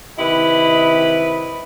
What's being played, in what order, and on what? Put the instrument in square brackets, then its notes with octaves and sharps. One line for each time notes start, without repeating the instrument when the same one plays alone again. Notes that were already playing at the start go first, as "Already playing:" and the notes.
[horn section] C3 D#3 E4 B4 D#5 B5